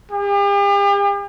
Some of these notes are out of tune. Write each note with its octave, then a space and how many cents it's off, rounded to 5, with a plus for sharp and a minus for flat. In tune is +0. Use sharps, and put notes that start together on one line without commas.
G4 +45